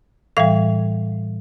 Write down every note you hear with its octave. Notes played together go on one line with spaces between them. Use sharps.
A2 E3 G3 F5